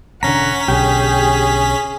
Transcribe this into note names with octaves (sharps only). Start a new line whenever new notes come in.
E1 D3 C#4 F#5 A#5 B6
B1 D3 G4 G#4